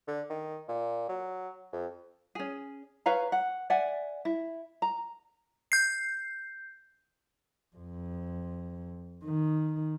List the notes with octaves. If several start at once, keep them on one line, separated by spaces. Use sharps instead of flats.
D3
D#3
A#2
F#3
F2
C#4 G#4
B4 C#5 F5 A#5
F#5
D5 E5 F#5 G#5
E4
A#5
G6 C7
F2
D#3